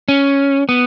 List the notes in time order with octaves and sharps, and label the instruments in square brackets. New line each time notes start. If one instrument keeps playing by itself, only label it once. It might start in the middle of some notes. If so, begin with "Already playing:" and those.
[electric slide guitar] C#4
B3